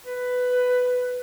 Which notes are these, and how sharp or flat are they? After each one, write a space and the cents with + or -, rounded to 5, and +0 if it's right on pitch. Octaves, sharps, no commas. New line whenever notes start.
B4 +10